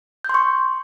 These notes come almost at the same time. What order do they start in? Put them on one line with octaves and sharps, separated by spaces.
G6 C6 C#6